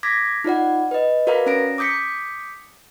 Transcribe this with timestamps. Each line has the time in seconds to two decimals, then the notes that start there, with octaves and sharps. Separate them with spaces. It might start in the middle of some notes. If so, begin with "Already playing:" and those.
0.03 D6 G#6 A#6 B6
0.44 D#4 F4 D5 F#5
0.91 B4 D#5
1.27 F#4 A#4 B4 D5 F5 A#5
1.46 C#4 A#5 A#6 D7
1.78 D6 D#6 G6 B6 C#7